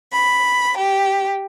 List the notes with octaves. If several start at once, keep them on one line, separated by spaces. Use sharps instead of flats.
B5
G4